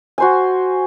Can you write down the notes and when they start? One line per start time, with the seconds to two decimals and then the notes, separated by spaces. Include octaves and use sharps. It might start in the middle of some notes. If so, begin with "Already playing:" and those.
0.18 F#4 C5 G#5